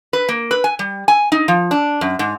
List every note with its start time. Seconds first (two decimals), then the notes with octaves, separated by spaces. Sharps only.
0.13 B4
0.29 A#3
0.51 B4
0.64 G#5
0.79 G3
1.08 G#5
1.32 D#4
1.48 F3
1.71 D4
2.01 F#2
2.19 G#2